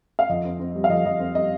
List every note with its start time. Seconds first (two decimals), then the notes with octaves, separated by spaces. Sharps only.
0.19 F5
0.29 F2 D#5
0.45 C4
0.60 C4
0.75 G3
0.84 F5
0.90 F2 D#5
1.05 F2 D#5
1.20 C4
1.35 G3 D#5